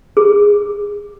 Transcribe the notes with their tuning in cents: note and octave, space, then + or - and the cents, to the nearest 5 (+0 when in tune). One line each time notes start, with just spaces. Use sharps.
G#4 -20